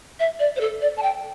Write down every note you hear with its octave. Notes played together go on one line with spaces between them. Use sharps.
E5
D5
C5
A4
D5
A5
G5